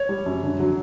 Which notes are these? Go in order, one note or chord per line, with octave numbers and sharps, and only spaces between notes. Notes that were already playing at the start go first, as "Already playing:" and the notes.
Already playing: C#5
G3
F#2
D3
F#3